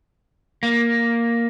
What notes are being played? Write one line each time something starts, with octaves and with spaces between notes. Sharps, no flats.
A#3